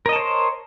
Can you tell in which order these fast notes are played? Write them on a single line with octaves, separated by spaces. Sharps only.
A#4 D#5 A5 C#5 C5